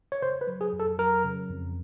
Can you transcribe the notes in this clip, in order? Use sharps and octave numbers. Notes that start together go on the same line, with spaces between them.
C#5
C#3 C5
B4
F#3
G#4
F2
A4
F#3 A#4
C#3
F2